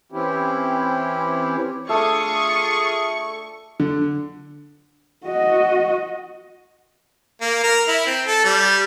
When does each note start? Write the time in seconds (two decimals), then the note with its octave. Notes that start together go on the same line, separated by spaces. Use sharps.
0.12 E3 C4 C#4 E4 G4
1.89 A3 D4 F4 G#4 C#6 D#6
3.80 D3
5.25 F#4 D#5
7.41 A#3
7.63 A#4
7.88 E4
8.06 C4
8.27 A4
8.44 G3